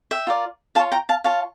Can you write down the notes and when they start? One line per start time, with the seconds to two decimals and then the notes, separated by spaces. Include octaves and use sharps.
0.11 E5 G5
0.27 F4 A#4 D5
0.75 F4 C#5 F5 A5
0.92 G5 A#5
1.09 F5 A5
1.24 F4 C#5 F5 A5